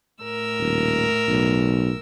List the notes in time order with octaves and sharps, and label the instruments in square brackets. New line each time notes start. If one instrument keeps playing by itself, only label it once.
[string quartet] A2 A#4 E6
[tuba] D#1
B1